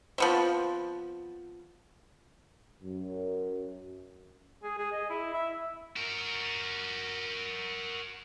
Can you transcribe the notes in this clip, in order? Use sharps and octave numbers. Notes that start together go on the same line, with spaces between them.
F3 B3 C4
F#2
G#4
G#4
D#5
E4
E5
F#4 A#4